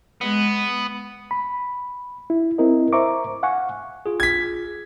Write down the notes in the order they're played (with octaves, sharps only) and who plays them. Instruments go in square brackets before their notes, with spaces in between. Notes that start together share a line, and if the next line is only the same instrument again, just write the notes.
[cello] G#3 [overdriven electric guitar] B3
[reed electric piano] B5
E4
C4 E4 A#4 D#5
C5 E5 A#5 C#6 D6
F5 F#5 G#5 C#6
[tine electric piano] F4 G#4
[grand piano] G#6 B6